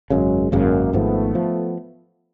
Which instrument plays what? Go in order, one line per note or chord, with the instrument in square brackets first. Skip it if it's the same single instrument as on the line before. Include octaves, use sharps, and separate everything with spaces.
[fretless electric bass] G#1 F#2 C#3 [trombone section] F#3 G#3
[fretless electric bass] G#1 F#2 C#3 [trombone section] G#3 A#3
[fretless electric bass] G#1 G#2 F3 [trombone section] A3 B3
[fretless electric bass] F3